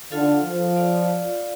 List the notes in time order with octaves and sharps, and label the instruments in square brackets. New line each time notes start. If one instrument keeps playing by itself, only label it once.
[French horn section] D3 [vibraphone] F4 A4 F5
[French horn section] F3
[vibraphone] F4 D5 F5